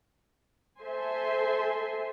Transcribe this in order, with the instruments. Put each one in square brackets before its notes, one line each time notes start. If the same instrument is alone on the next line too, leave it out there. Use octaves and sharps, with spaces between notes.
[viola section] A4 C5 E5 G#5 C6